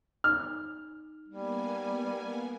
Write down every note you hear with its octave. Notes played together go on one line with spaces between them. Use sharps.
D#4 F6
G3 A#3 B3 G#5